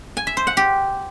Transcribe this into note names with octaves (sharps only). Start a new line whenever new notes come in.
G#5
E5
C5
F#5
G4